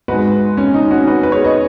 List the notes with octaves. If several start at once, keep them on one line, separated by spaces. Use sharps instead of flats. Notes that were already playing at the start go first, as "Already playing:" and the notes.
G#2 G#3 F#4 B4
C#4
D#4
C#4 F#4
F#4 B4
B4
G#4 C#5
B4 D#5